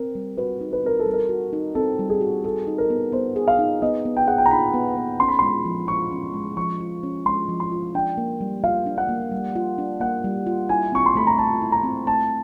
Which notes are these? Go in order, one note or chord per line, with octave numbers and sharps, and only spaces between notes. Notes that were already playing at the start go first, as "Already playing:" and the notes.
Already playing: C4 A#4
G3
F#4 B4
D#4
B4
C4 A#4
A4
G3
A#4
F#4
D#4
C4 A4
G3
G#4
F#4
G#4 A4
D#4
A#4
B3
B3 C5
G#4
F5
D#4
B3 D#5
B3
G5
G#4 F#5
G5
A#5
D#4 B5
B3
B3
C#4 C6
B5
G#3 C6
F3
F4 C#6
C#4
G#3
F3 C#6
F4
C#4
G#3 C6
F3
C6
F4
D4 G5
A#3
G3
F4 F5
D4
F#5
A#3
G3
F4
D4
A#3 F#5
G3
F4
E4 G#5
C4 C#6
C6
A3 B5
A#5
A3 A5
E4
A#5
C4
A3 A5